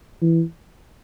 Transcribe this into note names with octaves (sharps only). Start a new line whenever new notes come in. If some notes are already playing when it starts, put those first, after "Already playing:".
E3